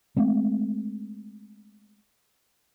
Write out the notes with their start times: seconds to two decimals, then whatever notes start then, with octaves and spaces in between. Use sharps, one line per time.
0.17 G#3 A3 C4